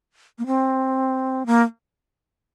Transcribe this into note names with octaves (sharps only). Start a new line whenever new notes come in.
A#3
C4
A#3